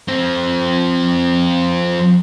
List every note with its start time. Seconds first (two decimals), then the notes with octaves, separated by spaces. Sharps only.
0.08 F3 C4